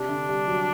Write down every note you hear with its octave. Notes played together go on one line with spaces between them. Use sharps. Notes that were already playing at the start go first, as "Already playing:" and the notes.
Already playing: C3 D4
D3
G3
F#3